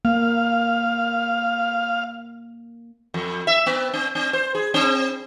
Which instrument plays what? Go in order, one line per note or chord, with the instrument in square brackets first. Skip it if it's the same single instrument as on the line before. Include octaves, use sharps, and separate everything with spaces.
[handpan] A#3 [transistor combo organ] F5
[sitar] F2
E5
B3
C4
C4
C5
G#4
C4